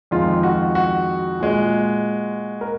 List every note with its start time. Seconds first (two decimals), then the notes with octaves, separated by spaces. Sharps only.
0.11 F2 D#3 G#3 F4
0.43 F#4
0.75 F#4
1.40 A#2 G#3
2.61 A#4